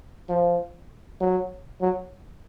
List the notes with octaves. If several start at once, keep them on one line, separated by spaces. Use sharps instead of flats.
F3
F#3
F#3